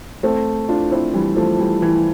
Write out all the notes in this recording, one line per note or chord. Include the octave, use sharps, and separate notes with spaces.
A3 C4
D4 F4
C4 E4
E3 G3
F3 A3
E3 G3
E3